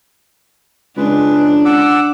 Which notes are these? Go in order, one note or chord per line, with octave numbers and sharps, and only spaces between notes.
C#2 G#3 D4 B4
F#5 D6 E6